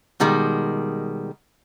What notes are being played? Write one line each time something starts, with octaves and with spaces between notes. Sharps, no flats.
B2 D#3 G3 G#3